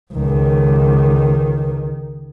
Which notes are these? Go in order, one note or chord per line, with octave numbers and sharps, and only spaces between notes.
C#2 D#3